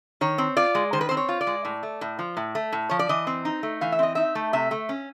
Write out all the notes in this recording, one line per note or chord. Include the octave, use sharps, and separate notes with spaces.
D#3 C#5
C4
F4 D5
G#3
D#3 C5
B4
C4 C5
C#5
F4
D5
G#3
A2
A3
A2
F3
A2
A3
A2
F3 C#5
D5
E3 D#5
C4
D#4
A3
E3 F5
E5
C4 D#5
D#4 E5
A3
C3 E5
A3
C#4